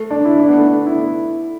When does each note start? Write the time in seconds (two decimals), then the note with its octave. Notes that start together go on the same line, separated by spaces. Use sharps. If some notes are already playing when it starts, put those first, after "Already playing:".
Already playing: A3
0.11 D4
0.25 E4
0.40 D4
0.48 B3
0.58 A3
0.68 D4
0.86 E4